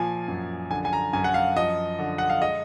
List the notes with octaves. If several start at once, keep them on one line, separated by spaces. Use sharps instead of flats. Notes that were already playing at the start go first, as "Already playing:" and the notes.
Already playing: A#2 F3 G#5
F#2
D3 G#5
G#5
A#5
F#2 G#5
F#5
F5
F3 D#5
D3
F#5
F5
G#3 D#5